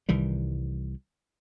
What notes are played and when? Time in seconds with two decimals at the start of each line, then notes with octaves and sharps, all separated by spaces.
0.09 C2 D#3 E3 G3